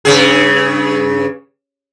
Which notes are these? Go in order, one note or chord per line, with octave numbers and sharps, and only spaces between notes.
G2 C#3 G#4